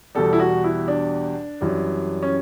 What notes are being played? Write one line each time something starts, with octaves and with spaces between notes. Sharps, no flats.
E2 B2 G3 A4
E4
F#4
E4
D4
F#2 E3 G3
C#4